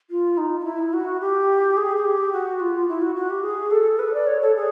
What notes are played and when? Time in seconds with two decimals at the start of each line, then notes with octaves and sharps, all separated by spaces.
0.10 F4
0.37 D#4
0.60 D#4
0.65 E4
0.93 F#4
1.20 G4
1.77 G#4
1.96 G#4
2.05 G4
2.32 F#4
2.60 F4
2.88 E4
3.02 F#4
3.16 F#4
3.30 G4
3.43 G#4
3.71 A4
3.99 B4
4.14 D5
4.27 C#5
4.41 A4
4.55 G#4